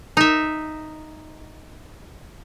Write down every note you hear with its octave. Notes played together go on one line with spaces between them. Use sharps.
D#4 E5